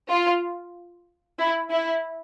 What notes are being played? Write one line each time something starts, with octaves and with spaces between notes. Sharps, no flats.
F4
E4
E4